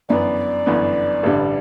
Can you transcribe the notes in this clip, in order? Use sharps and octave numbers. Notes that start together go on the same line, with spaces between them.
G1 F#2 E3 B3 D5
G1 F#2 E3 B3
A1 G2 D3 G3